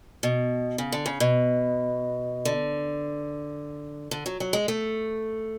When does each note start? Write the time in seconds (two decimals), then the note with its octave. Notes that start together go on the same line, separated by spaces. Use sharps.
0.23 B2
0.78 C#3
0.92 D3
1.06 C#3
1.20 B2
2.45 D3
4.11 D3
4.26 F#3
4.40 F#3
4.53 G#3
4.68 A3